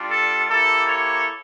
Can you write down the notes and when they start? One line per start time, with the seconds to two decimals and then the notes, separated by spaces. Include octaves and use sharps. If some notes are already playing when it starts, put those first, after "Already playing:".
Already playing: G3 D4 F4
0.10 A4
0.49 A#3 E4 G4 A4
0.87 A4 C#5